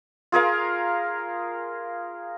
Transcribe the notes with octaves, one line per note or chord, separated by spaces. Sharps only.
F4 G#4 A#4 F5